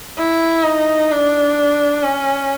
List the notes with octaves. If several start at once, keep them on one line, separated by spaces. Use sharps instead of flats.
E4
D#4
D4
C#4